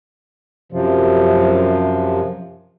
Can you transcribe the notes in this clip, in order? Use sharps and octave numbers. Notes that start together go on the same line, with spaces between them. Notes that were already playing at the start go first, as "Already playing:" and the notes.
F#2 C3 F3